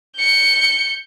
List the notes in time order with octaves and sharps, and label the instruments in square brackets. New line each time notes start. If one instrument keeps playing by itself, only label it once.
[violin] G6 C#7